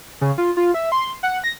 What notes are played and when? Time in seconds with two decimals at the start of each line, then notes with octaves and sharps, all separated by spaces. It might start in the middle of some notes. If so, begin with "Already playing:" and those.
0.21 C#3
0.38 F4
0.57 F4
0.74 E5
0.92 C6
1.23 F#5
1.44 A#6